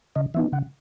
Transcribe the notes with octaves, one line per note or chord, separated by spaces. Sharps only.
C#3 D#5
E3 B3 D#4 E5
C#3 F#5